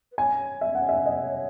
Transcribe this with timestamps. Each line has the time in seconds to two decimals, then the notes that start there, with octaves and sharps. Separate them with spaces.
0.11 B4
0.18 C#5 G#5
0.61 E5
0.75 F#5
0.89 E5
1.06 D#5